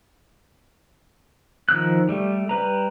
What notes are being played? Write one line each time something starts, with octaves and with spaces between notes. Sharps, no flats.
D#3 F3 E6 F#6
G3 A3
G3 B4 A#5